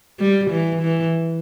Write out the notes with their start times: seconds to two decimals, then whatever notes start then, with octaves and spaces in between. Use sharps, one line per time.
0.19 G3
0.51 E3
0.82 E3